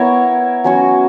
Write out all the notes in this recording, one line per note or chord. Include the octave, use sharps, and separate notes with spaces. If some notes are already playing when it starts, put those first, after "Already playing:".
Already playing: B3 E4 A#4 C#5
F#3 C#4 F#4